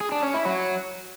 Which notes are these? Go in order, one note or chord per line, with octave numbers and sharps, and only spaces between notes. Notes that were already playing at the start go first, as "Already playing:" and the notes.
G#4
D4
C#4
E4
F#3